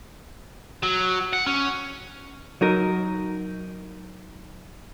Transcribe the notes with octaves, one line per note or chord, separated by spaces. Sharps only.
F#3
F#5
C#4
F#3 D#4 A#4